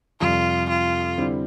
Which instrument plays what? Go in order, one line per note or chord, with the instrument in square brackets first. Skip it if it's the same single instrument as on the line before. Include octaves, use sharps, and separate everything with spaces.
[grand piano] F2 C3 G3 [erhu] F4
[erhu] F4
[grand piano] D3 G3 C4 E4 G4